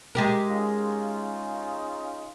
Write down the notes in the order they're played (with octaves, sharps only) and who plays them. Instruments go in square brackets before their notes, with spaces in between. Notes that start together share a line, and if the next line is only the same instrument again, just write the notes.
[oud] G#3 G4 A#4
[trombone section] C#4 D#4 F4